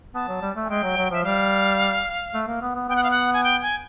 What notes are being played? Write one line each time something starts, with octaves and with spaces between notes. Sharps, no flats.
B3 A5
F#3
G3
A3
G#5
G#3 G5
F#3
F#3
F3 E5
G3 F5
A3
A#3
B3
B3
B3 G5
F#5
F5
F#5
G#5
G5
G#5